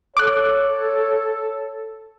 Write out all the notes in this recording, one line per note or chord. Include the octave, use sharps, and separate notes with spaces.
A4 C#5 D6 F#6